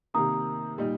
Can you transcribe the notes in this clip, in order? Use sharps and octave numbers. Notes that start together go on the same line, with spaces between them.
C3 D#3 A#3 A#5 D#6
A#2 G3 D#4